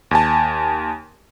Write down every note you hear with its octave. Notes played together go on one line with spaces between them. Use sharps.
D#2 G#5 A5